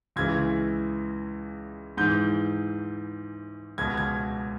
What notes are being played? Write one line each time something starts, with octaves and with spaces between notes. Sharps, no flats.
C#2 C#3 E3 G#6
G#2 E3 G6
C#2 B2 G#6
G#6